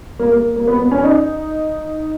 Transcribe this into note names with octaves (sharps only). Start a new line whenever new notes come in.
A#3
A#3
A#3
B3
B3
C#4
D#4